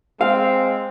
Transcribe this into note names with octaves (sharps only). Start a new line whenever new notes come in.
G#3 C4 F5